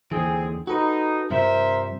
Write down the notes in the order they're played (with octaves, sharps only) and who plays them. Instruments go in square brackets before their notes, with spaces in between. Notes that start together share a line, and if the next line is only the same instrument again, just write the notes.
[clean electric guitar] D#2 D3 E3 [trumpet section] C4 G#4
[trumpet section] D#4 [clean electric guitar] F#4 A4 B4
[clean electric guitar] G2 C3 F3 [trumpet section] A#4 C5 E5